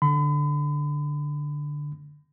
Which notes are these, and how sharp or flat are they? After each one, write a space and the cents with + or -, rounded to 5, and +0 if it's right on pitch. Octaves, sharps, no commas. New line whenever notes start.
D3 +0 B5 +40